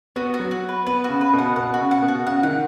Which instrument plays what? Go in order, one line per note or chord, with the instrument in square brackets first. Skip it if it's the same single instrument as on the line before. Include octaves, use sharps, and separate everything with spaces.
[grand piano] B3 [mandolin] F#4
[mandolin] F#4
[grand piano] F#3
[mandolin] F#4
B4
[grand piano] B3 [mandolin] B4
[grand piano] C#3 [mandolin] F#4
[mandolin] B4
[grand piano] B2
[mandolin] F#5
[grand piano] B2 [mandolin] F#5
[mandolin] F#4
[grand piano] C#3
[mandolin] F#5
[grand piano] B2
[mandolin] F#4
[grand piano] C#3 [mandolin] F#5
[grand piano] D#3 [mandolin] F#5